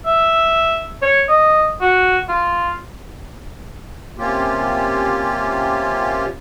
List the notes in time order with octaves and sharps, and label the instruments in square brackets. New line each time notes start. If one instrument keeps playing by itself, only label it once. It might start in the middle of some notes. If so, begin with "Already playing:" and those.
[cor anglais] E5
C#5
D#5
F#4
F4
[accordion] C3 A#3 C#4 F4 G4